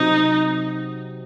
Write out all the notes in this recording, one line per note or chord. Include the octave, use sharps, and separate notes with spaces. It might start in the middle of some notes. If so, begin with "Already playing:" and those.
Already playing: C3 F#3 C4 D#4